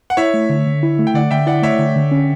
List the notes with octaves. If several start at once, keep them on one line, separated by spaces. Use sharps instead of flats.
F#5
E4 C#5 E5
A3
D3
D3
E4
A3
G5
D3 D5 F#5
D3 E5 G5
E4 D5 F#5
A3 C#5 E5
D3
D3
C#4